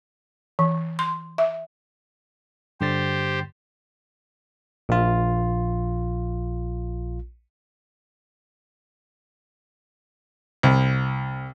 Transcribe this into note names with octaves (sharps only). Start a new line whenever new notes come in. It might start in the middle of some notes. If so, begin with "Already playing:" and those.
E3
C6
E5
G2 D3 G4 C5 A6
A#1 F4
C2